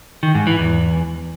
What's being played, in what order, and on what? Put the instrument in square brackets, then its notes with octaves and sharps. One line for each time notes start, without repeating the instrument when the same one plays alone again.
[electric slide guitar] D#3
G#2
E3
E2